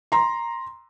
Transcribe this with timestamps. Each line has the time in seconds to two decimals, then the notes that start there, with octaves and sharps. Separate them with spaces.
0.12 A#5 C6